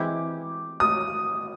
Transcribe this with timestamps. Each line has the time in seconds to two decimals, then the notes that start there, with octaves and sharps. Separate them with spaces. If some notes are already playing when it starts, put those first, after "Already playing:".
Already playing: E3 G#3 C4 E4 G4 D6
0.80 D#6